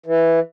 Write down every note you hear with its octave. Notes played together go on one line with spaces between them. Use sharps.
E3